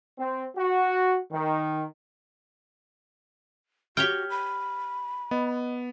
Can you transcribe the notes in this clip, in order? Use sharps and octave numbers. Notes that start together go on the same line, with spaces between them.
C4
F#4
D#3
F#4 G4 C#5 G5 F6
B5
B3 D#5